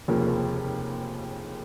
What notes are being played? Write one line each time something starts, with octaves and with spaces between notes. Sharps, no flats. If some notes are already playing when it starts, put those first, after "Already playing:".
F1 D#2 C#3 F3 A#3